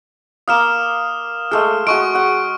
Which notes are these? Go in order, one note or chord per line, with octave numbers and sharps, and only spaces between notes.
A#3 F5 D#6 F6 E7
G#3 A3 G#4 F6
G#3 F#4 C#6 D7
F#5